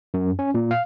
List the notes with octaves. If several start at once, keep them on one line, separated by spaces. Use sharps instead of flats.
F#2
C#4
A#2
F5